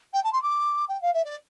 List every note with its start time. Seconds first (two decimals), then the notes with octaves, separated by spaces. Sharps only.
0.13 G5
0.23 A5
0.32 C6
0.42 D6
0.88 G5
1.01 F5
1.13 E5
1.24 D5